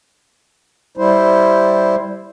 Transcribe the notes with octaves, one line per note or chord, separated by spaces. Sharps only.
G3 E4 C5